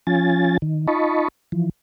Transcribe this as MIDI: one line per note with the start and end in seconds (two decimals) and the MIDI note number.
0.07 0.58 53
0.07 0.58 61
0.07 0.58 65
0.07 0.58 80
0.07 0.58 93
0.62 0.87 51
0.88 1.28 63
0.88 1.28 65
0.88 1.28 75
0.88 1.28 81
0.88 1.28 83
0.88 1.28 85
1.52 1.69 52
1.52 1.69 53